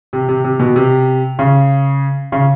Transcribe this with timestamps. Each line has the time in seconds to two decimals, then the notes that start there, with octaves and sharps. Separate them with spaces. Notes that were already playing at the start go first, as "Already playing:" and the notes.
0.13 C3
0.29 C3
0.44 C3
0.59 B2
0.76 C3
1.39 C#3
2.32 C#3